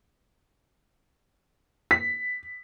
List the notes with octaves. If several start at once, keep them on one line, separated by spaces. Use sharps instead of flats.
B6